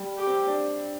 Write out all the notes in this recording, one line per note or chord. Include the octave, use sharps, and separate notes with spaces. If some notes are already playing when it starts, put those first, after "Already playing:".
Already playing: G3
G4
C4
D4